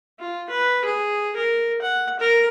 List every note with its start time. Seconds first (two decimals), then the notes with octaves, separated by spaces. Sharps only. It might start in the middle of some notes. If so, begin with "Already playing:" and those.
0.20 F4
0.50 B4
0.85 G#4
1.36 A#4
1.82 F#5
2.20 A#4